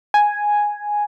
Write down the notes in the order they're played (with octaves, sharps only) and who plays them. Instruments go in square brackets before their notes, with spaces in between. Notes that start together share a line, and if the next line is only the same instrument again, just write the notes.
[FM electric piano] G#5